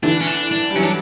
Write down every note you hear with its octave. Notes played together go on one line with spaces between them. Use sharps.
D3 E3 D4
C#4
D4
D4
G3
E3 F#3 C#4
D4